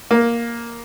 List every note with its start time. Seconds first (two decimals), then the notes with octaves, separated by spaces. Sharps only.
0.11 A#3